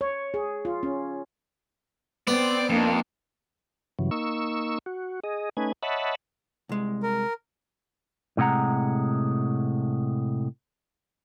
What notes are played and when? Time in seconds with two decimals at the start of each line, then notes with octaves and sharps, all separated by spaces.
0.01 C#5
0.34 G#4
0.65 F4
0.83 C#4
2.27 B3 C4 D5
2.70 F2 A#3 D4 D#4
3.99 G2 C#3 E3 F#3
4.11 A#3 D#4 C#6 E6
4.86 F#4
5.24 G#4 D#5
5.57 A3 C#4 D#4 B4 G#5
5.83 C#5 D#5 E5 F#5 A5 B5
6.69 C2 G#3
7.03 A#4
8.37 A2 C3 G#3 F#5 A#5